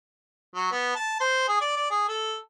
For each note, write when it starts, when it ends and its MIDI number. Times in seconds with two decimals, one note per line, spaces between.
0.55 0.67 54
0.72 0.91 59
0.95 1.17 81
1.20 1.44 72
1.48 1.60 68
1.61 1.75 74
1.77 1.86 74
1.91 2.04 68
2.09 2.36 69